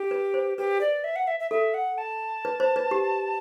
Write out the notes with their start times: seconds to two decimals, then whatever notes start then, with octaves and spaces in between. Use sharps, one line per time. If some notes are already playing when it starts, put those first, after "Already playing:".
Already playing: G4
0.11 B4
0.34 C5
0.58 G4 B4
0.81 D5
1.04 E5
1.16 F#5
1.27 E5
1.40 E5
1.51 A4 E5
1.74 F#5
1.98 A5
2.45 B4
2.60 C5
2.76 B4
2.91 G4